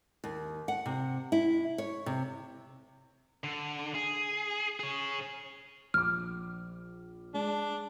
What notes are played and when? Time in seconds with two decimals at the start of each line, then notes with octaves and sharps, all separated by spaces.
0.24 D#2
0.68 F#5
0.86 C3
1.32 E4
1.78 C#5
2.06 C3
3.44 D3
3.95 G#4
4.80 G#4 C#5
5.94 A#1 D6 F6
7.34 G#3 D4